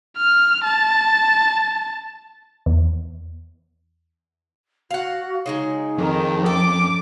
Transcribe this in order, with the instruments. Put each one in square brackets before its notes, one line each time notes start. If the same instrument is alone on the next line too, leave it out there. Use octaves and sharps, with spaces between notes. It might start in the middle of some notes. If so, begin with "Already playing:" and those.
[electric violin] F6
A5
[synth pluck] E2
[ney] F#4 [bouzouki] F5 F#5
[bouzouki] C#3 F#3 G#3 [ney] D#4
[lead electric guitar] F2 [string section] D#3
[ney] C#4 [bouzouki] A4 [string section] D6